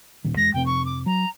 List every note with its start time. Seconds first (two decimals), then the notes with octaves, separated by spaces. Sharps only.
0.24 D#1 A#2 D#3
0.37 E2 G#3 A#6
0.54 F2 C3 C4 G5
0.66 C#6
0.86 D6
1.06 F#3 A#5